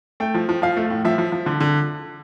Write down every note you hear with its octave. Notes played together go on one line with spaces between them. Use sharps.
A3 G5
F3
F3
F3 F5
A3
A2
F3 E5
F3
F3
D3
D3